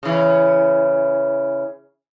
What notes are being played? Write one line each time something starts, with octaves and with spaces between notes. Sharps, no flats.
C#3 E3